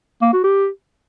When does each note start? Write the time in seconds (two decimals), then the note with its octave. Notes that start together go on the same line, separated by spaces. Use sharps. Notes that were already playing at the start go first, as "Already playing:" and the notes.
0.22 A#3
0.33 F#4
0.44 G4